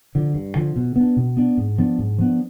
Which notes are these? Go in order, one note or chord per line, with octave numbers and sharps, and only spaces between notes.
D3 F3
G2
D3 F3
B2
B3 D4
B2
B3 D4
G#2
F3 B3 D4
G#2
F3 B3 D4